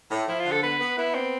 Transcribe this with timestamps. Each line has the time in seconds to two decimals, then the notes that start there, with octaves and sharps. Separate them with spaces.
0.11 A2
0.28 F3 E4
0.39 F4
0.46 D3
0.52 A4
0.63 B3 B4
0.80 B3
0.98 B3 E4
1.15 C4